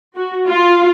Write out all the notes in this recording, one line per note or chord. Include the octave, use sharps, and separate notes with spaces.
F#4
F4